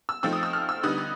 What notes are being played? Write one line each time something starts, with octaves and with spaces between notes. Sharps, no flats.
E6
F3 A3 C4 D#4 E6
D#6
E6
F6
E6
D3 G3 B3 D#4 D#6
D#6